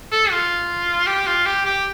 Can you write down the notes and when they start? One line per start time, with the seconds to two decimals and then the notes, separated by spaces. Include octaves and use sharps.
0.11 A4
0.31 F4
1.07 G4
1.27 F4
1.46 G4
1.65 G4